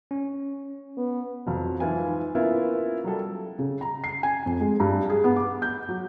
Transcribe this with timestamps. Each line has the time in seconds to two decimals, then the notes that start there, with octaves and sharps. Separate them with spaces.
0.11 C#4
0.97 B3
1.46 F2 F#3
1.80 G#2 E3 E4 F4 B4 G#5
2.35 A#3 B3 C#4 E4 F4
3.04 F#3 G3 A4
3.59 C#3
3.81 A#5
4.04 C7
4.23 G#5
4.46 F2
4.60 G#3
4.80 G2
5.10 G#4
5.24 B3
5.36 D6
5.62 G6
5.89 F#3